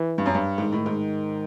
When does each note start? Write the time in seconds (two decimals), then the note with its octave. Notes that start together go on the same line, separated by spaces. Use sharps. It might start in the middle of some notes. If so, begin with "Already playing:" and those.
Already playing: E3
0.18 G2
0.26 F#2
0.35 G2
0.58 G#2 D#3
0.72 A2
0.86 G#2